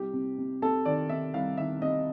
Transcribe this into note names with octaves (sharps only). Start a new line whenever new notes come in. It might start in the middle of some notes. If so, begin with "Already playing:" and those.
Already playing: C2 G4
C3
C3
C3 A4
D#3 D5
C3 E5
C2 F5
D#3 E5
C3 D#5